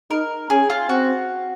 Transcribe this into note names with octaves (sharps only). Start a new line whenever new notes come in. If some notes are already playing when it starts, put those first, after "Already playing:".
D#4 A#4
C#4 G#4
F4
C4 F#4